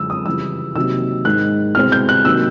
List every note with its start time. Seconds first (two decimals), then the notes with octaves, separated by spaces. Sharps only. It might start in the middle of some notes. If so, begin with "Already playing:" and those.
Already playing: F#2 D3 F3 G#3 E6
0.10 D#6
0.26 F2 C#3 E3 G3 E6
0.75 C3 D#3 F#3 A#3 E6
1.25 G#2 D#3 G#3 F#6
1.75 C2 B2 G#3 C4 F6
1.92 G6
2.09 F#6
2.25 C3 D#3 F#3 A#3 E6